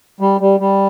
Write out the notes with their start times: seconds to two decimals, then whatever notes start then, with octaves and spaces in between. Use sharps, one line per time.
0.20 G3
0.41 G3
0.60 G3